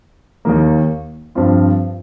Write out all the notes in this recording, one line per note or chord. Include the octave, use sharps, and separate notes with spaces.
D#2 D#3 A#3
G2 F3 C4 F4